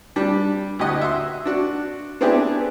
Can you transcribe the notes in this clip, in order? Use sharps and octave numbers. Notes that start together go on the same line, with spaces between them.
G3 D4
D2 G4 D#5 F#5
E5 F#5 C6
D4 F#4
B3 C4 D4 E4 G4 G#4